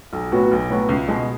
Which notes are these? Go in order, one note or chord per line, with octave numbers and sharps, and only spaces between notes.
B1
A2 F#3 B3 F#4
B1
A2 F#3 B3 F#4
C#2
B2 G#3